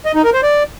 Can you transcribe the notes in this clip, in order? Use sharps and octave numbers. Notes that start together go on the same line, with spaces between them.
D#5
D#4
A#4
C5
D5